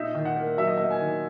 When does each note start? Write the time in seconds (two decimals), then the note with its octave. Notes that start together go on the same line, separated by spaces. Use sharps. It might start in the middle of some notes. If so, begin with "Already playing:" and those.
Already playing: A#2 D#4 E5
0.15 D#3
0.25 F#5
0.36 A#3
0.58 F#3 E5
0.67 D#5
0.78 A#3 E5
0.90 G#5
1.00 D#3